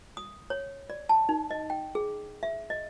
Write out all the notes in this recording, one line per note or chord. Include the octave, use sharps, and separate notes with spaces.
D#6
C#5
D5
A5
D#4
D#5
G5
G#4
E5
D#5